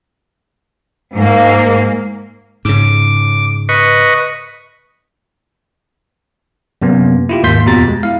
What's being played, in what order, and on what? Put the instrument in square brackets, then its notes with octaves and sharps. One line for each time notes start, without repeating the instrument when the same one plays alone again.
[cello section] G#2 A#3
[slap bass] G#2 C#3 [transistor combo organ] D6
[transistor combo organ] B4 D#5 C#6
[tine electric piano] F#2 C3 A#3 B3
E4 F4 G4
D#2 G#2 A#3 C6 G6 B6
F2 B2 F4 G4 A#5 A6
G#3
E4 F5